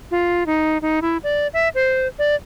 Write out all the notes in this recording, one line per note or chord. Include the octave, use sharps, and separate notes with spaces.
F4
D#4
D#4
E4
D5
E5
C5
D5